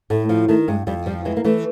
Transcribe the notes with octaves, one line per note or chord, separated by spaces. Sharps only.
A2 A3
F3
D#3 A3
G2 G#3
F2 G3
F3 G3
E3 G#3
A#3
E3 A3